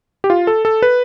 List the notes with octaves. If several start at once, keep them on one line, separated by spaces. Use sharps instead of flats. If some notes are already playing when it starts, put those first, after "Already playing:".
G4
F4
A4
A4
B4